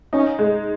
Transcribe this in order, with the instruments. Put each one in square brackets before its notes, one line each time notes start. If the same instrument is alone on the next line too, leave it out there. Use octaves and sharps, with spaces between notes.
[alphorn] C#4 [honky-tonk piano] D#4
[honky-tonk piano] G#3